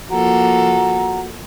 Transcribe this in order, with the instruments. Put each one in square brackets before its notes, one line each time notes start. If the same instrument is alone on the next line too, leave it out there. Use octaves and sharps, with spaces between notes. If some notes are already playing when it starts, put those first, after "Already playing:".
[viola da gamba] F3 A#3 A4 [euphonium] F#4 [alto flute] A#5